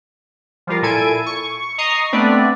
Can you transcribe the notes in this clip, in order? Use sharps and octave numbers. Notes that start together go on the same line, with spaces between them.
F3 G3 F4 A#4
A#2 E4 A4 G#5 G#6 D7
C#6
D#5 A#5 C#6 D#6 C7
A3 B3 C4 D4 B4 D5